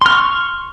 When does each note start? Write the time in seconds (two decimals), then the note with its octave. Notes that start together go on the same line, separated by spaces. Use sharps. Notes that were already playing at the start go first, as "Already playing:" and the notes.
0.01 C6
0.06 F6
0.10 C#6